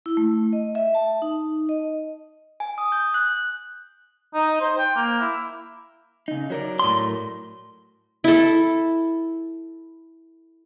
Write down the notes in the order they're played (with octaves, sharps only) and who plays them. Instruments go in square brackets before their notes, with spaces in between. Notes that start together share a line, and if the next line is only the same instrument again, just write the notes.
[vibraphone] E4
A3
D#5
E5
A5
D#4
D#5
[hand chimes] G#5
D#6
G6
F#6
[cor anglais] D#4
C5
G5
A#3
E4
[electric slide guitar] C#3 D#4
F#3 A#4 D5
[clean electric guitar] A2 C6
[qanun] E4 A4